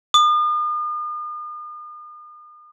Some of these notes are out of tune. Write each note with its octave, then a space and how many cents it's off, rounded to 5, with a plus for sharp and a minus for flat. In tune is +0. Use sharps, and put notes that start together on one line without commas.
D#6 -45